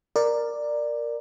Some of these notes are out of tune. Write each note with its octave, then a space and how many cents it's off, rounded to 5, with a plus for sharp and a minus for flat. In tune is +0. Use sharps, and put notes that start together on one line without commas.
A#4 +0 D5 +10